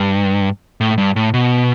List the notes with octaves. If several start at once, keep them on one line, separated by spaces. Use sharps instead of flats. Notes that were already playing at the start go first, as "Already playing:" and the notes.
Already playing: G2
A2
G2
A2
B2